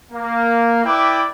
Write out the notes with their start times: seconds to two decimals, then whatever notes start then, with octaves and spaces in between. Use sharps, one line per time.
0.12 A#3
0.85 E4 B4 D5 G5 B5 D6